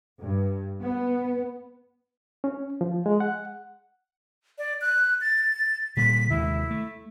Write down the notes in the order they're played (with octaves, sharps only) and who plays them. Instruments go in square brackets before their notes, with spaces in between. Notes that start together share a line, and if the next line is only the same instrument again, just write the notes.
[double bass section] G2
B3
[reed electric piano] C#4
F3
G#3
F#5
[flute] D5
F#6
A6
[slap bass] A#2 D3 G3 [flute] B6
[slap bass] D#2 C3 G#3 [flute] E4
[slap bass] A3